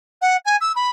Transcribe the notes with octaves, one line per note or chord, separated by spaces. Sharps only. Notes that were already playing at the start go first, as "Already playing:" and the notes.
F#5
G#5
E6
B5